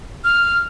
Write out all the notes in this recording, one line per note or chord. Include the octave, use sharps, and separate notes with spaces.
F6